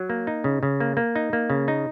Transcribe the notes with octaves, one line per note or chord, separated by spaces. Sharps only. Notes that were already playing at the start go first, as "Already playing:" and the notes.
Already playing: F#3
A#3
D#4
C#3
C#3
A#3
A#3
D#4
A#3
C#3
D#4